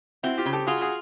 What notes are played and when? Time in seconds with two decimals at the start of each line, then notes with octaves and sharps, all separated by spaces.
0.23 C4 E4 F#4
0.38 F4 G4
0.46 C#3
0.53 G4 A4
0.67 F4 F#4 G#4
0.81 F#4 G#4